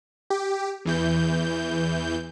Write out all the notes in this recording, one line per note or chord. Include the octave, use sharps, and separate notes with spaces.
G4
E2 E3 G6